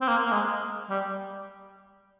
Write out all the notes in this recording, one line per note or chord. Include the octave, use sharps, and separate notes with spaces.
C4
A#3
A#3
G#3
G3